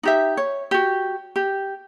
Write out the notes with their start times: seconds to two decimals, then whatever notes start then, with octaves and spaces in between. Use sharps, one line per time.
0.03 D#4 G4 E5
0.37 C#5
0.71 F#4 G4
1.36 G4